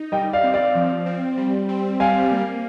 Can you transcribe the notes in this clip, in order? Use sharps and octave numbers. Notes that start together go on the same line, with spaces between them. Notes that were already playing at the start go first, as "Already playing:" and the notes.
Already playing: D#4
G3 D#5 G5
D5 F5
C4
D5 F5
F3
C4
G3
C4
G3 F5 G#5
A#3